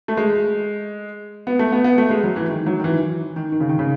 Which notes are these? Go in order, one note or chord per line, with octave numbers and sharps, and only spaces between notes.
A3
G#3
B3
A3
B3
B3
A3
G#3
F#3
E3
D#3
F#3
D#3
E3
D#3
D#3
C#3
D#3
C#3